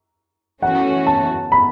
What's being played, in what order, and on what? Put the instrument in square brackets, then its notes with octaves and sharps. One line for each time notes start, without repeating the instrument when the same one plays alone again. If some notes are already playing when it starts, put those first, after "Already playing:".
[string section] E3 A3 C#4 F#4 [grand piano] F#5
[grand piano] A5
B5